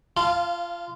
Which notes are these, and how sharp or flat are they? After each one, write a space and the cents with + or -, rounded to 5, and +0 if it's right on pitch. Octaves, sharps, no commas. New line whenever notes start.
F4 -25 F5 +0 A5 +0